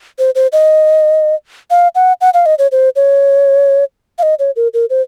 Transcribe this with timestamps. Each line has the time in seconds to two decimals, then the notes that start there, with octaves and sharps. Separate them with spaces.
0.19 C5
0.35 C5
0.53 D#5
1.70 F5
1.95 F#5
2.21 F#5
2.34 F5
2.46 D#5
2.59 C#5
2.72 C5
2.96 C#5
4.18 F5
4.23 D#5
4.39 C#5
4.56 A#4
4.74 A#4
4.90 C5